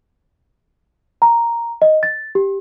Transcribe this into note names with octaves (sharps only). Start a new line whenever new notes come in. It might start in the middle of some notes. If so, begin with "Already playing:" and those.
A#5
D#5
A6
G4